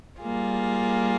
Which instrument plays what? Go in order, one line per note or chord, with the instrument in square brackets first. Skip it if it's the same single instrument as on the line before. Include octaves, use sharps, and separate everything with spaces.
[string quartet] G3 A#3 F4 G#4